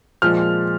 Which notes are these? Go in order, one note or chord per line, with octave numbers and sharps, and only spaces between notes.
A#2 F3 G#3 F6